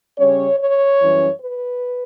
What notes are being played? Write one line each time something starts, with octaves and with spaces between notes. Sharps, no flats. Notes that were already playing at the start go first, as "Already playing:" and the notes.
C#3 G3 C#4 C#5
C#5
F#2 E3 G3 C#4
B4